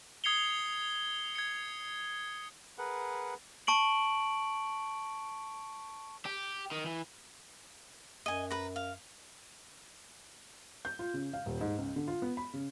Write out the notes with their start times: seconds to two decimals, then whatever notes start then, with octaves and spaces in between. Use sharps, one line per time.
0.24 D#6 G#6 C7 C#7 F7 G7
1.35 G#6 C#7
2.78 G#4 A#4 B4 F#5
3.67 A5 C#6 D7 F#7
6.26 G4
6.72 D#3
6.86 E3
8.26 F#2 D#5 G#5
8.50 B4 A#5
8.76 F5
10.85 G6
10.99 F4
11.14 C#3
11.33 F5
11.46 D#1
11.61 G#2
11.78 C#2
11.96 D3
12.07 F4
12.22 B3
12.37 B5
12.53 C#3